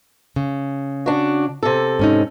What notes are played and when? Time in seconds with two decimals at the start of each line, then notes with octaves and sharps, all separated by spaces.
0.36 C#3
1.06 D4 F#4
1.63 C3 A4
1.99 G#2 C#4 D#4